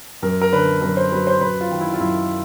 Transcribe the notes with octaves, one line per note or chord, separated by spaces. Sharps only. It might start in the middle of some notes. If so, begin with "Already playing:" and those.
F#2 A#4
A#4
D3 B4
F#2 A#4
C5
F#3 B4
C5
F#2 B4
F4
D#3
E4
F4
F#2 E4